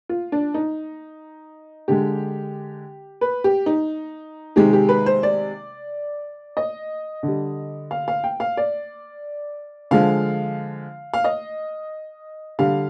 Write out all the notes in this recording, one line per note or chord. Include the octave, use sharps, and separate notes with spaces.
F4
D4
D#4
D3 G#3 G4
B4
G4
D#4
C3 D#3 G#3 G4
G4
B4
C5
D5
D#5
D3
G3
F5
F5
G5
F5
D5
D3 F3 G#3 F5
F5
D#5
D3 G3 F5